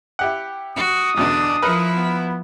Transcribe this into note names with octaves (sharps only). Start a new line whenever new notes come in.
E4 G4 F#5
F#4 D#6
E2 B2 D3 D4
F3 E4 A#4 B4
B3